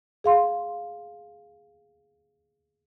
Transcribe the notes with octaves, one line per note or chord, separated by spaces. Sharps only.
G#4 F5 C6